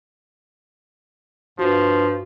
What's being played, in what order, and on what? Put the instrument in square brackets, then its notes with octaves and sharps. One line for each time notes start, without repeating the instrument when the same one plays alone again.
[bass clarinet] G2 [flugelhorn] F3 [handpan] F#4